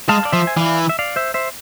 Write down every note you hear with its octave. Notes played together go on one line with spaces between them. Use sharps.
G#3 F5 A5
D5
F3 C5 E5
G#5
E3 D5 F5
E5
D5 F5
C5 E5
C5 E5